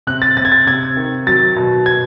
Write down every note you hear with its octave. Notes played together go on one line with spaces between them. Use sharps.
C3 F#6
A6
C3 A6
G#6
A6
C3 G#6
D#3
F#3 A6
B2
B2 G#6